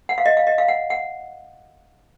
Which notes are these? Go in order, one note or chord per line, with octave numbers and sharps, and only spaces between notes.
F#5
F5
D#5
F5
D#5
F5
F#5
F#5